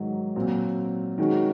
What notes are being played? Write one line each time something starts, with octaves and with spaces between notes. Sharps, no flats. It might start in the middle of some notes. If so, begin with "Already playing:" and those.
Already playing: G#2 D#3 F#3
A#2 F#3 C4
D#3 G#3 C#4 F#4